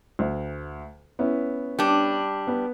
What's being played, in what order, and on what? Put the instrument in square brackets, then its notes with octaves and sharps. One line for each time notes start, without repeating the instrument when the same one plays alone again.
[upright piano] D2
B3 C#4 E4
[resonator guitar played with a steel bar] G3 D4
[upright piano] B3